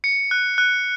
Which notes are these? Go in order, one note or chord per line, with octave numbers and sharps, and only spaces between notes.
C#7
F#6
F#6